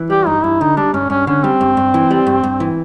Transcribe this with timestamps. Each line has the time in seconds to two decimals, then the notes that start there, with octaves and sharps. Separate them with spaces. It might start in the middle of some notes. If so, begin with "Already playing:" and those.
Already playing: E3
0.10 G3 G4
0.27 G2 D#4
0.43 G2 E4
0.61 D3 D#4
0.77 G3 D4
0.93 G2 C#4
1.10 G2 C#4
1.27 D3 C#4
1.44 G3 C4
1.61 G2
1.77 G2
1.94 E3
2.11 G3
2.27 G2
2.44 G2
2.60 E3